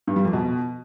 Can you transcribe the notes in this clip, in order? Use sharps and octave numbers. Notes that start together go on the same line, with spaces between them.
G2
G3
F2
B2